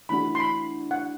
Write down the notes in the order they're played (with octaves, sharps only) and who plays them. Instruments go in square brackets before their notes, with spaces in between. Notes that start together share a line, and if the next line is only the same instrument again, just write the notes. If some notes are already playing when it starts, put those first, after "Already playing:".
[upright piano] E3 A3 D4 F#4 [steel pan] B5
[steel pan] C6
B5
F#5